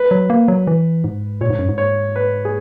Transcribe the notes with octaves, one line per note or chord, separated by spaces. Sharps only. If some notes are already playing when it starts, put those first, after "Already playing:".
Already playing: B4
F#3
A#3
F#3
E3
G#2
A#2 C#5
G#2
F#2
G#2
C#5
B4
G#4